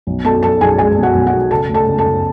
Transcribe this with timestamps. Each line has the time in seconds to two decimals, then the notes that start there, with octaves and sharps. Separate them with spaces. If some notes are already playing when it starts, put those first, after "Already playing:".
0.07 B1
0.25 B2 A4 A5
0.43 B1 A4 A5
0.61 B1 G#4 G#5
0.78 G#3 G#4 G#5
0.97 B2
1.03 F#4 F#5
1.15 B1
1.27 F#4 F#5
1.33 B2
1.51 C#3 A4 A5
1.69 D2
1.74 A4 A5
1.86 C#3
1.98 A4 A5
2.05 C#3